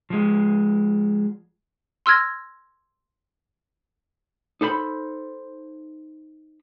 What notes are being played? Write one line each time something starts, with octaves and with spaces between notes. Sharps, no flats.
F3 G#3
C6 E6 F6 G#6 A#6
D#4 A4 C5 B5